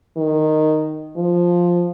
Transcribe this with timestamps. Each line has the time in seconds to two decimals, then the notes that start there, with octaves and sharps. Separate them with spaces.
0.17 D#3
1.16 F3